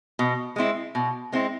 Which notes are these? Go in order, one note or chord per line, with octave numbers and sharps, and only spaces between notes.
B2
G#3 C4 E4
B2
G#3 C4 E4